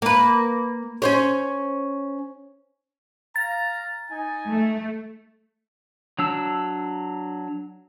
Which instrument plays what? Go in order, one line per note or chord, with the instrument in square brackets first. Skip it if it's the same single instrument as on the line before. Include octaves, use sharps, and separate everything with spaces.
[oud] A#3 B4
C#4 C5 C#5
[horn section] F5 A#5 [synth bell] A6
[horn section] D#4 G#5
[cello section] A3
[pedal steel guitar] F#3 D4 E6